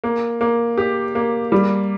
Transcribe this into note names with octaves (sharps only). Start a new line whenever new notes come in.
A#3
A#3
G4
A#3
G3